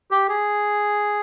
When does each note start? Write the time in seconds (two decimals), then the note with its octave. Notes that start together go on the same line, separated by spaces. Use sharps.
0.11 G4
0.29 G#4